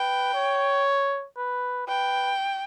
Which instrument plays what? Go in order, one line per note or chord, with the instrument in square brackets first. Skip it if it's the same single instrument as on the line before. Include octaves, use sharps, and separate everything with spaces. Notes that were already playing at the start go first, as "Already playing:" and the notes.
Already playing: [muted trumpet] B4 [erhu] G5
[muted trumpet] C#5
B4
[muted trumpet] B4 [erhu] G5